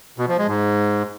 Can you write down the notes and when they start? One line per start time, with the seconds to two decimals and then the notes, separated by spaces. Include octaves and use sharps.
0.18 B2
0.28 F3
0.38 G#3
0.48 G#2